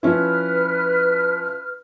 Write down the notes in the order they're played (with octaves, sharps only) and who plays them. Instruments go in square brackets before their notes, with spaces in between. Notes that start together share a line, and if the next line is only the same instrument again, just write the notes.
[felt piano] F3 C#4 E4 [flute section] B4 F6